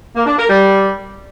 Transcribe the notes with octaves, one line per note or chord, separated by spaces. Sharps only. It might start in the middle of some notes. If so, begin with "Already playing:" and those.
A#3
D4
A#4
G3